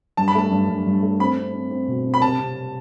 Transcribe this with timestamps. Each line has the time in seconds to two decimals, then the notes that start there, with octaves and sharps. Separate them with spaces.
0.17 G2 A5
0.28 B5
0.35 A3 A5
0.51 G2
0.69 G2
0.86 G2
1.02 A3
1.20 C4 B5
1.37 C4
1.54 C4
1.71 C4
1.88 B2
2.05 C4
2.14 B5
2.22 C3 A5
2.39 C3